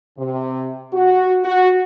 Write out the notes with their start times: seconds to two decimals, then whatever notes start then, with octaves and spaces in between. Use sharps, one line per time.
0.19 C3
0.93 F#4
1.44 F#4